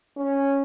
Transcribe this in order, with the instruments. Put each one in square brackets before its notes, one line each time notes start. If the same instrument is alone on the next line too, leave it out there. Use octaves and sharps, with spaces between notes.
[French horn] C#4